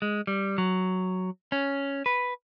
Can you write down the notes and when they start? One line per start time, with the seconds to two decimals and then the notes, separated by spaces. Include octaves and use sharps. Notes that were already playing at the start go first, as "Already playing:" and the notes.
0.02 G#3
0.27 G3
0.58 F#3
1.52 C#4
2.06 B4